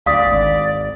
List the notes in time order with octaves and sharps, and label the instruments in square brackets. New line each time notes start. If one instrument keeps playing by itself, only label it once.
[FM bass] D2 [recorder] D5 [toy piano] F5 D#6
[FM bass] G#1